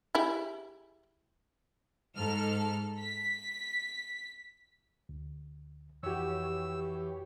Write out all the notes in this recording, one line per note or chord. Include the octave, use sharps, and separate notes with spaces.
E4 G4 G#4
G#2 A4 F6
B6
D2
F2 E3 F#4 G4 C#5 E6